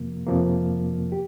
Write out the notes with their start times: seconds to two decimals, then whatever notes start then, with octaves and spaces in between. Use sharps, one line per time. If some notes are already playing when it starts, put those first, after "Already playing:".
Already playing: F2 C3 F3 A#3
0.27 F2 C3 F3 A#3
1.12 G4